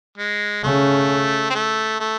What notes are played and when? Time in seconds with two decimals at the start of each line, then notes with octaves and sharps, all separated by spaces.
0.18 G#3
0.64 C#3 A3
1.50 C4
1.55 A3
2.00 A3